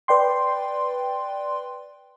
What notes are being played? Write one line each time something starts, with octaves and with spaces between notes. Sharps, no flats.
B4 D5 G5 C6